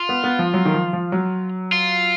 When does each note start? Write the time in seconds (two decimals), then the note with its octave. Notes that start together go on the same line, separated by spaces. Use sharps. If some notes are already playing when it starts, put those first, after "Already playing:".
Already playing: F4
0.09 B3
0.24 B3
0.39 F3
0.54 F#3
0.65 D#3
0.74 F3
0.93 F3
1.12 F#3
1.72 F4